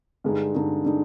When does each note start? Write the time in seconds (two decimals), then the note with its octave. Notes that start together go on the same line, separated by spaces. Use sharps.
0.24 G2 D3 G#3 D#4
0.55 G2 D3 G#3 D#4
0.85 D3 G#3 D#4